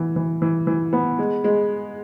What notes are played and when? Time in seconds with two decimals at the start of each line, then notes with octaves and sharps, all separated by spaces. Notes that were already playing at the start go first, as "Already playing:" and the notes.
Already playing: E3 B3
0.16 E3
0.42 E3
0.67 E3
0.93 B3
1.19 G#3
1.44 G#3